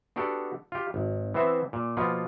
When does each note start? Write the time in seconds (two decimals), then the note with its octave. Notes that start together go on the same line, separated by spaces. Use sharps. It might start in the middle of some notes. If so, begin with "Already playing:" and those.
0.16 B3 D4 F#4 G4 A4
0.72 F4 G4
0.94 G#1
1.34 E3 B3 C4 C5 E5
1.73 A#2
1.97 B2 F3 A#3 B3 F4